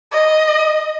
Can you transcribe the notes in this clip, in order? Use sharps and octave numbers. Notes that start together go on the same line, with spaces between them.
D#5